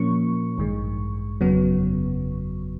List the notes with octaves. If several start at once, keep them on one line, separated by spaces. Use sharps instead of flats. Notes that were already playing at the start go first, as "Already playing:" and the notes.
Already playing: A#2 F3 A#3 C#4 C#6
A1 G2 D#3 G#3
G1 F2 C#3 F#3 B3